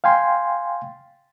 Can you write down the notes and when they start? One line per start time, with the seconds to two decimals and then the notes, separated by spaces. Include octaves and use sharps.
0.04 F5 G5 G#5 C6